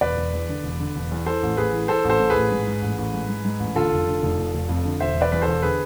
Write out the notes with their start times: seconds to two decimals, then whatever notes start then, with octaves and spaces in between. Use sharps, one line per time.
0.01 E1 B4 D5
0.17 E1
0.33 E2
0.49 D3
0.64 E1
0.80 D3
0.96 E1
1.11 E2
1.26 E3 A4 C5
1.43 A1
1.57 A1 G#4 B4
1.73 E3
1.88 E3 A4 C5
2.04 A1
2.10 A4 C5
2.20 A2
2.30 A1 G#4 B4
2.51 G#2
2.67 G#2
2.82 A1
2.98 A1
3.13 G#2
3.28 G#2
3.45 G#2
3.60 A1
3.75 D3 F4 A4
3.92 F1
4.07 D3
4.23 F1
4.39 F1
4.54 F1
4.69 F2
4.85 D3
5.00 E1 C5 E5
5.15 E1
5.21 B4 D5
5.32 E2 B4
5.42 A4 C5
5.48 E1
5.62 D3 G#4 B4